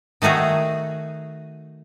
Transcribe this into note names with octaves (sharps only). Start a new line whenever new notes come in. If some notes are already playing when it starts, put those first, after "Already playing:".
D#3 A3 D#4 F#4 G#4